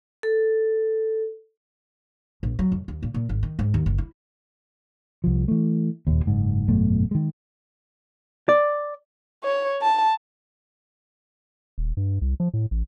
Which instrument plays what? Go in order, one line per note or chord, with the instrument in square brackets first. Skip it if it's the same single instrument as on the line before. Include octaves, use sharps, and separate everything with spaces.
[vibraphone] A4
[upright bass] A#1
F#3
F2
D#2
A#2
A#2
G#1
D#3
G#2
D#2
F#1
E4
[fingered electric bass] C2 F3
E3 A3
D#1 G#1 D#2
F#1 G#2
G#1 F#2 B2 A3
D#3 G#3
[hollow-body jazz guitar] D5
[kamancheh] C#5
A5
[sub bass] D#1
G2
C2
F3
A2
A1